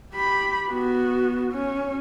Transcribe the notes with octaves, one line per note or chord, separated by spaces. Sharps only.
G4 B5
B3 F#4
C#4